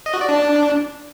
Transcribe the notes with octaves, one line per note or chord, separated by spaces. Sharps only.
D#5
F#4
D5
D4